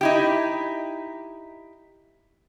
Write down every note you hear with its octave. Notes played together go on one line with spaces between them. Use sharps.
D#4 E4 G4